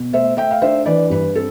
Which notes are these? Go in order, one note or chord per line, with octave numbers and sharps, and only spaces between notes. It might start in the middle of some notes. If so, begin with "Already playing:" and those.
Already playing: B2
A3 C5 E5
A3 E5 G5
F5
D4 C5 E5
E3 B4 D5
G2 B4
C4 A4